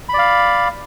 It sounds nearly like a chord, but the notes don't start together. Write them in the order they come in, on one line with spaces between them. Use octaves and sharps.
B5 D5 F5